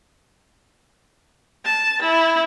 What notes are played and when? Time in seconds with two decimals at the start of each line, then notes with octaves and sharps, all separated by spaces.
1.65 A5
2.02 E4